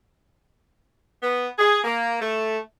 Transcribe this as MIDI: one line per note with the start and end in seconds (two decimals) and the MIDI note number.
1.23 1.48 59
1.59 1.81 68
1.84 2.16 58
2.20 2.57 57